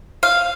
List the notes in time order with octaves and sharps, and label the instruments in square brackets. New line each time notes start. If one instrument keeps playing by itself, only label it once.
[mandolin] F5